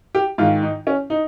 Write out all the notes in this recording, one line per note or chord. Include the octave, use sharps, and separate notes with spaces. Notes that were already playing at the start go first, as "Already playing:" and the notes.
G4
G#2 D#3 F4
D#4
C#4
D#4